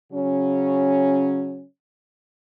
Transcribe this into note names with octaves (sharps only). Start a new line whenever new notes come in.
C#3 F#3 C#4